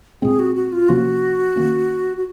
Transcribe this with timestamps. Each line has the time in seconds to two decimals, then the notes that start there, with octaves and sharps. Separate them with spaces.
0.22 A#2 G#3 C4 G#4
0.39 F#4
0.55 F#4
0.72 F4
0.88 C3 F3 A#3 C#4 F#4
1.56 D#3 A#3 C#4
2.17 F#4